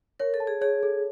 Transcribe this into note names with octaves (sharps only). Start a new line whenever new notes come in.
A#4 C#5
A4
A5
G#4
G#4 C#5
A4